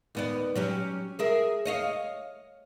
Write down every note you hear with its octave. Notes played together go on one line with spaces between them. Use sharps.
D#2 B3 D5
F#3 C#4 G4
G#4 A#4 E5
C#5 D#5 F5